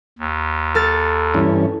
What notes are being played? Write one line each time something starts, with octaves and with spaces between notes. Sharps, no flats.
D#2
A4 F6 A6
G2 E3 C#4